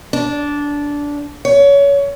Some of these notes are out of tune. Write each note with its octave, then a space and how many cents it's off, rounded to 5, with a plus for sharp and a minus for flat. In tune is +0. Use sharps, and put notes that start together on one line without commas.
D4 -15
C#5 +25